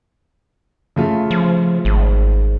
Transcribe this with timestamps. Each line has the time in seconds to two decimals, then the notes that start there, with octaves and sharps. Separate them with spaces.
0.96 C#3 A3 F4
1.31 F3
1.85 G#1